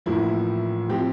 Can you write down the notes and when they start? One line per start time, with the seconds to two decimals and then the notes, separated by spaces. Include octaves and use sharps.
0.06 A1 A2 F3 A#3 E4
0.88 A2 F3 C4 G4